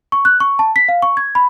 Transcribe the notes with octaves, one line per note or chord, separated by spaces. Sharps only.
C#6
F#6
C#6
A5
B6
F5
C#6
G#6
B5